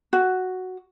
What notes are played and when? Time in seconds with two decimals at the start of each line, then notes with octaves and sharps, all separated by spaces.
0.13 F#4